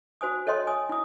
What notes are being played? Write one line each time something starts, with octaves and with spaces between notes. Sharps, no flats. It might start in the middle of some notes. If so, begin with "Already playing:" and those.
F#4 C5 G#5 D#6
A4 C#5 D#5 G5 C6
G#5 D#6
E4 D#6